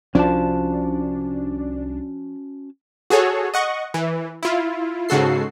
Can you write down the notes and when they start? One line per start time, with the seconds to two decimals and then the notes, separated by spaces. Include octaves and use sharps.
0.15 C2 F3 C#4 D4 F#4 A5
3.10 F#4 G#4 A4 C#5
3.54 D#5 F#5 C#6
3.94 E3
4.43 E4 F4
5.09 G#2 C#3 F#4 A4 C7